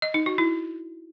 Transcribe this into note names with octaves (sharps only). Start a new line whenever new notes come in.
D#5
D#4
F#4
E4